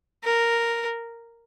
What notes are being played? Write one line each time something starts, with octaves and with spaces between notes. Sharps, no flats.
A#4